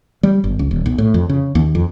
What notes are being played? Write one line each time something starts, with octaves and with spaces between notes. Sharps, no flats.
G3
G1
C#2
D#1
B1
A2
F2
C#3
D#2
F2